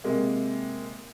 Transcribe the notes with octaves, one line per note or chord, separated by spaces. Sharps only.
C3 G#3 A#3